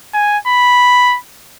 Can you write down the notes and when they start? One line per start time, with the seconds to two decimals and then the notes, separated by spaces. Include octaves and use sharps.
0.14 G#5
0.48 B5